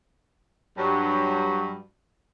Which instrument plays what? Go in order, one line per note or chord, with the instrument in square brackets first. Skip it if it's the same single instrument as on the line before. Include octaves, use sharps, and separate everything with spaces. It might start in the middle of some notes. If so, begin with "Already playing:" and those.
[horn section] G2 F#3